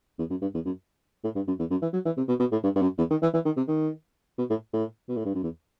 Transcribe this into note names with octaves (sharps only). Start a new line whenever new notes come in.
E2
F#2
G2
E2
F#2
A2
G2
F#2
E2
F#2
E3
F#3
E3
C3
B2
B2
A2
G2
G2
F#2
E2
D#3
E3
E3
D#3
C3
D#3
B2
A2
A2
B2
A2
G2
F#2
E2